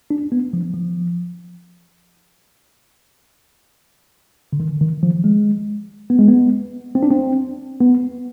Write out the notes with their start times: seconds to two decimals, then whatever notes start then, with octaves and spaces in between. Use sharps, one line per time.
0.10 D4
0.32 B3
0.53 F3
0.74 F3
4.53 D3
4.60 D#3
4.81 D#3
5.03 F3
5.24 G#3
6.10 B3
6.19 G#3
6.28 B3
6.95 C4
7.03 D4
7.10 C4
7.81 B3